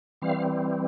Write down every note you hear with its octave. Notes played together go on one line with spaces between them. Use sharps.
E3 G3 C4 F5